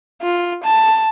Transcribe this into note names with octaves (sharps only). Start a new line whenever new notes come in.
F4
A5